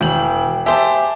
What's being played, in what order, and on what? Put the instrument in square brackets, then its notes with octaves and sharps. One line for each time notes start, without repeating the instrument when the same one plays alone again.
[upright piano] E1 F#7 [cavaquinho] G5
[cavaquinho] G4 G#4 C5 [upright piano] E5 A5